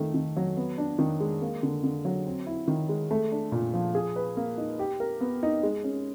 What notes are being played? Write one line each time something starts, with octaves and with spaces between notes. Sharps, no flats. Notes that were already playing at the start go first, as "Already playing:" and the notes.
Already playing: D#3 A3
D#3
F#3
B3
D4
D#3
G#3
A#3
D3
D3
F#3
C4
E4
D#3
G#3
A3
D4
A#2
F3
G#4
B4
A#3
D#4
G4
A#4
B3
D#4
G#3
C#4